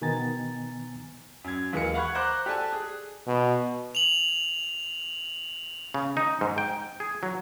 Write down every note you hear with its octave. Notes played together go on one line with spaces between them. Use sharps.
B2 D#3 B3 G#5 A#5 A6
F#2 G#6
D#2 E3 G#3 A#4 C#7
F5 F#5 B5 C#6 F#6 G#6
C5 A#5 D6 F#6
G4 A4 D5 G#5 A5
G#4
B2
F7 F#7
C#3
D#4
G#2
G5
G#4
F#3